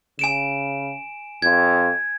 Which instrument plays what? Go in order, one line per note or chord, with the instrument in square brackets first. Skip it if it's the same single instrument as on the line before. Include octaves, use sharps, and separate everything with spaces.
[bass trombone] C#3 [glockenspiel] G#5 D7 E7
[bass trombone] F2 [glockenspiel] G#6